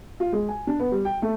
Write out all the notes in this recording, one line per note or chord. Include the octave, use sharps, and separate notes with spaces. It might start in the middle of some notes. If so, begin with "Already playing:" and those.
F4
G#3
G#5
D4
B3
G3
G5
A3